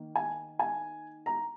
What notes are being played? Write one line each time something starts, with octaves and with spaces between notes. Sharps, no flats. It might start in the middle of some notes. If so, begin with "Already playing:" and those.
Already playing: D#3 A#3
G#5
G#5
A#5